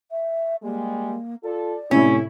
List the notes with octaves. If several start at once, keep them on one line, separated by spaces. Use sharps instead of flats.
E5
G3 G#3 A#3
F4 A4 D5
A2 C3 C#4 E4